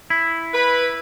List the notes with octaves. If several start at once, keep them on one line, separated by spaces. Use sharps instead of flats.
E4
B4